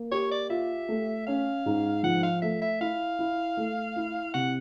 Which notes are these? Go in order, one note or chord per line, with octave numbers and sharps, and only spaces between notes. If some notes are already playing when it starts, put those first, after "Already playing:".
Already playing: A#3
G4 C#5
D5
F4 E5
A3
C#4 F5
G#2
F3 F#5
F5
A3 E5
E5
E4 F5
E4
A3
E4
C3 F#5